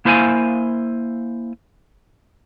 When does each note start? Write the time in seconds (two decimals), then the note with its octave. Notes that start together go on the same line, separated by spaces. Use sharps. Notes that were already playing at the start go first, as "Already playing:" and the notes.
0.05 A#3 E4 C5 F5 G5 G#5